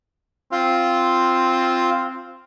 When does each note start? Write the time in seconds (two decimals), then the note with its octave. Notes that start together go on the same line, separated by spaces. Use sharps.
0.52 C4 F4 F5